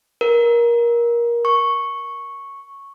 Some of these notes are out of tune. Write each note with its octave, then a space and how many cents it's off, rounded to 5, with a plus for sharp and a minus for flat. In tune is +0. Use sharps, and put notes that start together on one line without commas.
A#4 +20
C#6 -5